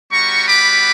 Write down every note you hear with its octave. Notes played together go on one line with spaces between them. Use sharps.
G3 B3 F#4 A#5 C#6
B5 D6